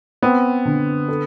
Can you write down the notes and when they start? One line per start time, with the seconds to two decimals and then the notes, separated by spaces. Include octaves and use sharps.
0.22 B3 C4
0.65 D3
1.08 A4